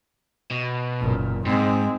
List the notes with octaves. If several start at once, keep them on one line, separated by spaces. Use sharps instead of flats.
B2
F#1 A#2
G#2 G#3 C4